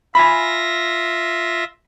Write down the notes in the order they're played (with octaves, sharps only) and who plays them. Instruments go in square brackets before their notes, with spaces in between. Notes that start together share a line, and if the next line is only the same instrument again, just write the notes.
[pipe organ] F4 E5 A#6 [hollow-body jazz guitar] G#5 B5